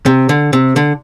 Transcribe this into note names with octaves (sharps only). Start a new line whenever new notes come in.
C3
D3
C3
D3